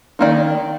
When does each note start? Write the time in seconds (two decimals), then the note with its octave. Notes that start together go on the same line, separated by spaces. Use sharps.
0.19 D#3 A#3 D#4 D5